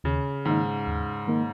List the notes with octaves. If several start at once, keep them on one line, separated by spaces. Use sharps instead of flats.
D#2 C#3
G#2 D#3 A#3 D#4
D#2
D#3 A#3 D#4